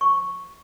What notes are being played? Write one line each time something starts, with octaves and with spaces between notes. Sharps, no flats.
C#6